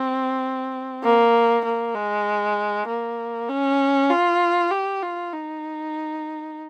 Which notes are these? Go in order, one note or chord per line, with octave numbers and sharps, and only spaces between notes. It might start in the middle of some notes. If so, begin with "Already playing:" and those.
Already playing: C4
A#3
A#3
G#3
A#3
C#4
F4
G4
F4
D#4